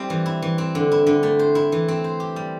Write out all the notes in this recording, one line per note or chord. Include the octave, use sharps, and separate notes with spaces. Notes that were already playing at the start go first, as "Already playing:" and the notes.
Already playing: G3 C4 E4 G4
E3
E4
E3
C4
D3
E4
D3
A3
C5
E4
E3
C4
C5
G4
G3